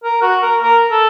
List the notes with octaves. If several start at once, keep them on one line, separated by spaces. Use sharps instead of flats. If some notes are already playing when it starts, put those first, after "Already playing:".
A#4
F#4
A#4
A#4
A4